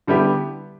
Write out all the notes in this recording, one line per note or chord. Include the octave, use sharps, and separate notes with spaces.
D3 G3 B3 E4 G4